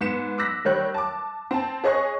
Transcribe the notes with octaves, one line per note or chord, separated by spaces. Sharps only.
G#2 B3 B6 C#7 E7
D6 E6 F#6 A#6 B6
D#3 G3 C#5 F#6
A5 D6
C4 A5
G#4 C#5 D#5 C#6 F#6